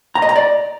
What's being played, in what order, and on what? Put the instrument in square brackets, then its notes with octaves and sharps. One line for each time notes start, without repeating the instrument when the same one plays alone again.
[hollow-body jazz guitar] A#5
D#5
A#5
D5